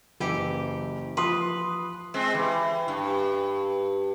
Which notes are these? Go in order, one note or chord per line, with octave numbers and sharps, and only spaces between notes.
F#1 E3 G4
F3 B4 C6 D#6
G#3 C4
E3
G2